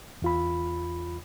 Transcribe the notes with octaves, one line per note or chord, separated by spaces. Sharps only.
E2 F4 B5